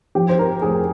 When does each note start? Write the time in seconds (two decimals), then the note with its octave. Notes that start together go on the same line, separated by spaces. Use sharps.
0.15 F3 G4
0.29 C5
0.39 A#4
0.62 F1 G#4